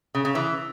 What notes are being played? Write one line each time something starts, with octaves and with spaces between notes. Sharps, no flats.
C#3
C#3
E3